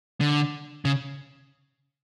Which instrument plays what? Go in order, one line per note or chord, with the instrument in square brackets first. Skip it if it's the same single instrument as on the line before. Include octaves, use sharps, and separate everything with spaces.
[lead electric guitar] D3
C#3